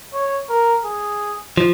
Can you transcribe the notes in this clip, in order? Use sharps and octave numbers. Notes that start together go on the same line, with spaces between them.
C#5
A#4
G#4
F3